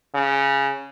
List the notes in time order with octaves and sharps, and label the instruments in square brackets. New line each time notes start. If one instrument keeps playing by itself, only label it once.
[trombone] C#3